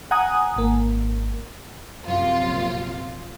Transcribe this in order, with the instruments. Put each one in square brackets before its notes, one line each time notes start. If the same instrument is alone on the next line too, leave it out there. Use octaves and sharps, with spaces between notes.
[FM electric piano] F#5 G#5 A#5 D#6
G#1 A#3
[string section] A#1 F#2 C3 F4